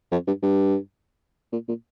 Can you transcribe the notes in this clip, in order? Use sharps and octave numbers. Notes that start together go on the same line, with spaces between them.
F2
G2
G2
A#2
A#2